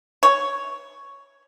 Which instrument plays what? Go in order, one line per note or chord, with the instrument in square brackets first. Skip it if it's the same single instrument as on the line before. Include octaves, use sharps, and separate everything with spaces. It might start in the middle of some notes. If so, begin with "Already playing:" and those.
[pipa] C#5